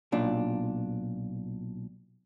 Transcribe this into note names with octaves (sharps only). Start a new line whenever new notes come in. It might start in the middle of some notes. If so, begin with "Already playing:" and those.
B1 A#2 D4